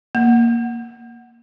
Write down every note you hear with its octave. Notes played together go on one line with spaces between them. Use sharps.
A#3